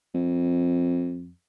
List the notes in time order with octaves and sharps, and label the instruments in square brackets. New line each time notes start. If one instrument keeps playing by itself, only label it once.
[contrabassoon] F2